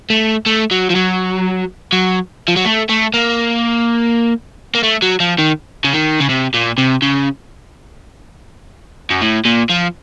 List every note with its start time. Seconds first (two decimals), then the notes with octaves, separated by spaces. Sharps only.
0.10 A3
0.46 A3
0.71 F#3
0.90 F3
0.95 F#3
1.93 F#3
2.48 F3
2.56 F#3
2.65 A3
2.89 A3
3.14 A#3
4.75 A#3
4.83 A3
5.02 F#3
5.20 F3
5.38 D#3
5.84 C#3
5.93 D#3
6.20 C#3
6.29 C3
6.54 A#2
6.78 C3
7.02 C#3
9.10 F#2
9.21 A2
9.45 A#2
9.69 F3